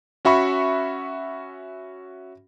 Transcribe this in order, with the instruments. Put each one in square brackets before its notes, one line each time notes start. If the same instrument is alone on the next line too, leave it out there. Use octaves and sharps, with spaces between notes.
[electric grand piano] C#4 F#4 E5 B5 C#6